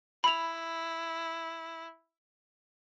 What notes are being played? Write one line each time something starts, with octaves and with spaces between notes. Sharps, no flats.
E4 B5 F7